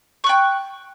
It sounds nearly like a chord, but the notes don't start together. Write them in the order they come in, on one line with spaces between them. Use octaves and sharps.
C#6 F#6 G5